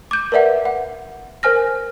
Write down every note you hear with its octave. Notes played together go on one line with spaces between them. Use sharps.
D6 G6
A#4 B4 D5 E5 F#5
F#5
A#4 C5 G#5 F6 A#6